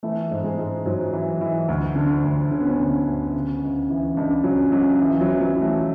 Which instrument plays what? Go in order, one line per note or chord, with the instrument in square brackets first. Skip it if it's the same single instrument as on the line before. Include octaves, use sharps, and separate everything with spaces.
[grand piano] E3 A3
G#2
G#3
G#2
G#2 F#3
E3
E3
D2
D3
D2
D3 C#4
B3
C#4
D2
D2
C#3
C#2
E3
C#2 D4
C#3 F#3
C#2 F#3
E3
F#3
E3
F#3
E3
A3